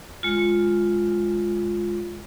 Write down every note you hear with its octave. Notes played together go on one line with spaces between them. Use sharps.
G#3 F4